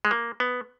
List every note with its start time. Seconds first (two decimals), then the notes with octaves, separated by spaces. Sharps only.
0.05 G#3
0.11 A#3
0.40 B3